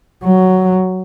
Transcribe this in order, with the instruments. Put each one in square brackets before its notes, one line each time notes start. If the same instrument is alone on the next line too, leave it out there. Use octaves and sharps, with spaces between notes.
[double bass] F#3